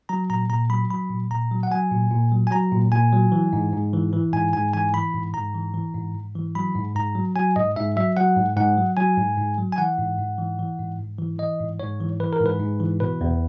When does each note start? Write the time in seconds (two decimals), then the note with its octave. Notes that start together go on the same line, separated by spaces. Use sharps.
0.09 F#3 A#5
0.30 A#2 A#5
0.50 A#2 A#5
0.70 F#3 B5
0.90 F#3 B5
1.10 A#2
1.31 A#2 A#5
1.51 F#3
1.63 F#5
1.71 F#3 G#5
1.91 A#2
2.11 A#2
2.32 F#3
2.47 G#5
2.51 F#3 A#5
2.72 A#2
2.92 A#2 G#5
3.12 F#3
3.32 E3
3.53 G#2
3.73 G#2
3.93 E3
4.13 E3
4.33 G#2 G#5
4.53 G#2 G#5
4.73 E3 G#5
4.94 E3 B5
5.14 G#2
5.34 G#2 A#5
5.54 E3
5.74 E3
5.95 G#2
6.15 G#2
6.35 E3
6.55 F#3 B5
6.75 G#2
6.96 G#2 A#5
7.15 F#3
7.36 F#3 G#5
7.56 G#2 D#5
7.76 G#2 E5
7.97 F#3 E5
8.17 F#3 F#5
8.36 G#2
8.57 G#2 F#5
8.78 F#3
8.97 F#3 G#5
9.18 G#2
9.38 G#2
9.58 F#3
9.72 G#5
9.78 E3 F#5
9.98 G#2
10.18 G#2
10.38 E3
10.59 E3
10.79 G#2
10.99 G#2
11.19 E3
11.39 E3 D#5
11.60 G#2
11.80 G#2 C#5
12.00 E3
12.20 E3 B4
12.33 A#4
12.40 G#2
12.46 B4
12.60 G#2
12.80 E3
13.00 B2 B4
13.21 E2